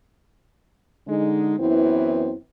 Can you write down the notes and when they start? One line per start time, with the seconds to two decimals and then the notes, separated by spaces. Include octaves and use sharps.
1.08 D3 G#3 D#4
1.59 F#2 E3 B3 C4 E4